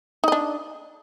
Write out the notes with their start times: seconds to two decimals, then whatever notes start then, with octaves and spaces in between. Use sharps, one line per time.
0.24 D#4
0.28 D#5
0.32 D4